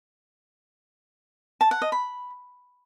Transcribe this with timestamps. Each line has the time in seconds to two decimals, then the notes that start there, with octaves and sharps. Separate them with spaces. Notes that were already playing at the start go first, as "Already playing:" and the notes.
1.61 A5
1.71 F#5
1.82 D#5
1.92 B5